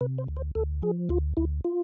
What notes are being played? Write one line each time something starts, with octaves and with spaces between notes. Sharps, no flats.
C3 B4
C5
D2
C5
D2 A4
F3 G#4
D2 F4
D2 E4
F4